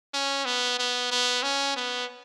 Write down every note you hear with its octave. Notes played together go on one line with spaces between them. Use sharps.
C#4
B3
B3
B3
C#4
B3